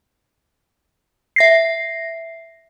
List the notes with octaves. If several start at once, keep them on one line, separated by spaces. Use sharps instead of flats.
E5 A#6 C7